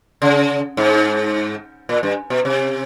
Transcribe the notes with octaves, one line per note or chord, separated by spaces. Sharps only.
C#3
G#2
A#2
G2
B2
C3